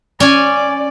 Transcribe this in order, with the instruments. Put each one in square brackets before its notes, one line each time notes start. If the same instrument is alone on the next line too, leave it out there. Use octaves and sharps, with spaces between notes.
[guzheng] C#4 G#5 [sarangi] D5